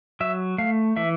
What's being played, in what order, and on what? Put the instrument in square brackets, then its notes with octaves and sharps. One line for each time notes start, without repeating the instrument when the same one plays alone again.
[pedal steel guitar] F#3 E5
A3 F5
E3 E5